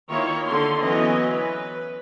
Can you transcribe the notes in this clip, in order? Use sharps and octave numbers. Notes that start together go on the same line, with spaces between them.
D#3 A#3 E4 F4 C#5
D3 C6
E3 F#3 B3 C#4 D#5
B4